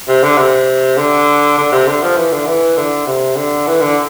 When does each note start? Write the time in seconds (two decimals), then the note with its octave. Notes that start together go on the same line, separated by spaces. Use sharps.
0.08 C3
0.23 D3
0.38 C3
0.98 D3
1.58 D3
1.72 C3
1.88 D3
2.02 F3
2.17 E3
2.32 D3
2.47 E3
2.77 D3
3.06 C3
3.36 D3
3.67 E3
3.81 D3